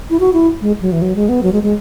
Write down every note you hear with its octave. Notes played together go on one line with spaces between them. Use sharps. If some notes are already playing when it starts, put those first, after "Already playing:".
E4
F#4
E4
G#3
F#3
E3
F#3
G#3
B3
F#3
G#3
G#3